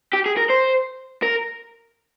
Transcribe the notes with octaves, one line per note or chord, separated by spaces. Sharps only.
G4
G#4
A#4
C5
A#4